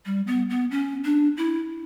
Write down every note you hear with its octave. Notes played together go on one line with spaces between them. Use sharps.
G3
B3
B3
C#4
D4
E4